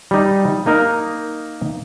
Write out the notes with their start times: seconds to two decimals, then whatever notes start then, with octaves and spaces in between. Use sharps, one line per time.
0.11 G3 D#4
0.66 A#3 D#4 A#4